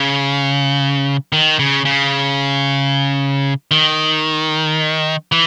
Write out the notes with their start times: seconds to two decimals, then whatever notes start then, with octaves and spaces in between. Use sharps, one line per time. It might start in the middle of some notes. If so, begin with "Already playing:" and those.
Already playing: C#3
1.33 D#3
1.59 C#3
1.85 C#3
3.71 D#3
5.32 E3